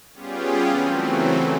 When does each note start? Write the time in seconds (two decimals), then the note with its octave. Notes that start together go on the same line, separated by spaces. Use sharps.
0.14 G3 B3 C#4 F4 G4 G#4
0.67 C#3 E3 F#3 A3 C4